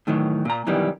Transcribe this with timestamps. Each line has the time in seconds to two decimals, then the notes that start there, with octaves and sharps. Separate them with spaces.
0.07 A2 D#3 E3 F#3
0.45 A#2 A#5
0.67 F#2 B2 D#3 E3 G3